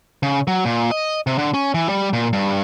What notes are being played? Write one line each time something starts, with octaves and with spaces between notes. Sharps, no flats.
C#3
F#3
A#2
D#5
C3
D3
C#4
E3
G3
A#2
G2